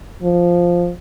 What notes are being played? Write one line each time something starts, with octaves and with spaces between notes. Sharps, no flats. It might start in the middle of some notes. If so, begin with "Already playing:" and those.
F3